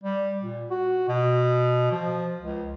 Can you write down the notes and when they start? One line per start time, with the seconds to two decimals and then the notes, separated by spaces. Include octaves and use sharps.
0.04 G3
0.41 A#2
0.70 F#4
1.09 B2
1.91 F3
2.42 C#2